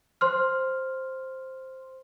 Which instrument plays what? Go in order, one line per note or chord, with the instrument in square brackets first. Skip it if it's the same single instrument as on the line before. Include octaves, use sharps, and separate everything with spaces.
[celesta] C5 C6 F6